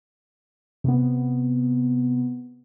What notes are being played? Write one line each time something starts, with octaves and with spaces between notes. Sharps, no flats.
C3 B3